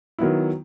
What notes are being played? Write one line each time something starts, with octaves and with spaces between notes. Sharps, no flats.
D#3 F#3 B3 E4